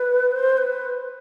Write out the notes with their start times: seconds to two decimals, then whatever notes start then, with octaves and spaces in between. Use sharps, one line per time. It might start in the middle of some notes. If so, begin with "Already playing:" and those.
Already playing: B4
0.31 C5
0.57 B4